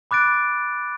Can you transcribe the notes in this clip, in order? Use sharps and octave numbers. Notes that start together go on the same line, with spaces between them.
B5 D6 F#6 A6 D7